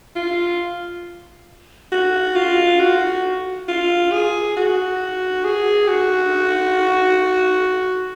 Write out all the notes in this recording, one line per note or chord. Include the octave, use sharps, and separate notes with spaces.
F4
F#4
F4
F#4
F4
G#4
F#4
G#4
F#4